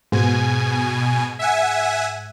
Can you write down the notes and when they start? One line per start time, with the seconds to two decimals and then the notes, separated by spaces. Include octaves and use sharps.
0.12 G#2 B2 G#5
1.39 E5 F#5 G#5